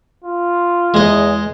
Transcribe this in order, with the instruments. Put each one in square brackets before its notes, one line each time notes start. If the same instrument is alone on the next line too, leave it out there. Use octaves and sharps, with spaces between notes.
[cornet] F4
[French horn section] E2 [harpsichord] G#3 D#5